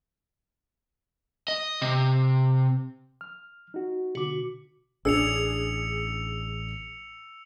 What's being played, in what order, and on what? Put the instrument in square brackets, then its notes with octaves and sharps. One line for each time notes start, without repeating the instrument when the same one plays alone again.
[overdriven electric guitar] D#5
C3
[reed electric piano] F6
D#4 F#4
[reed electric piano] B2 D3 D6 [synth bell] F#4
[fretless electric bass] A1 [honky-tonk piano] D4 G#4 [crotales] E6 C#7 F7